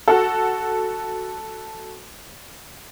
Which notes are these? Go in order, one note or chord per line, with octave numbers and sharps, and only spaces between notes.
F#4 A4